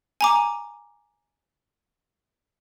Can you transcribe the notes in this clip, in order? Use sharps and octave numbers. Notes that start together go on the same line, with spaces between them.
G#5 A#5 D6